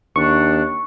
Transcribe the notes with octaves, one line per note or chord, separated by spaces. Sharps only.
D#2 D4 C#6